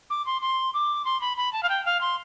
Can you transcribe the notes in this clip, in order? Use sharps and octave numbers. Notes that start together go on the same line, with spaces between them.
D6
C6
C6
D6
C6
B5
B5
A5
F5
G5
F5
C6